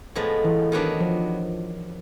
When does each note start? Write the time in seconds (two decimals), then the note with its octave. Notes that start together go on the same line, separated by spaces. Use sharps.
0.15 A2 F3 G#3 B3
0.44 E3
0.72 D#3 F#3 B3 D4
1.00 F3